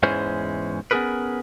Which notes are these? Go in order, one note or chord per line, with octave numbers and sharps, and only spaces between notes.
E2 G#2 E3 G#3 C#4 C5
B3 C#4 D#4 G#4 A#4 B4